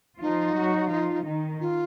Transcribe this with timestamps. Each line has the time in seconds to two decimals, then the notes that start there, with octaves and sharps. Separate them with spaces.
0.21 F3 D#4 F4
0.56 F#3 F#4
0.91 F3 F4
1.26 D#3 D#4
1.61 F4